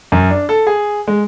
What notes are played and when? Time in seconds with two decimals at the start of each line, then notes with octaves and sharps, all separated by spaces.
0.12 F#2
0.30 D4
0.49 A4
0.67 G#4
1.08 G#3